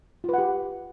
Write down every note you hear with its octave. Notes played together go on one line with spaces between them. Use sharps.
F4 G4 B4 F#5